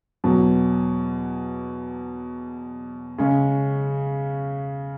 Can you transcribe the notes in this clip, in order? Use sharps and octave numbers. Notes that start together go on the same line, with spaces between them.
E2 B2 F#3
C#3 G#3 C#4